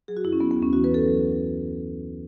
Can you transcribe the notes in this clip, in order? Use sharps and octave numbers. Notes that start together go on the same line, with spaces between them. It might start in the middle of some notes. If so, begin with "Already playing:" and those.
F#3 G#4
F#4
F#2 E4
C#4
F#3 B3
B3
D#2
C#4
E3 F#4
B4
F#2 A4
F#3